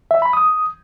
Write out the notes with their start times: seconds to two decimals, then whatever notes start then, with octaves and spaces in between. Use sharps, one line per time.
0.11 E5
0.22 B5
0.33 D#6